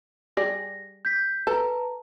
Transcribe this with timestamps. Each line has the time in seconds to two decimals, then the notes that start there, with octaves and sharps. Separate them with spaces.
0.37 G3 G#4 D5 A#6
1.05 G6 B6
1.47 A4 B4 A5 A#5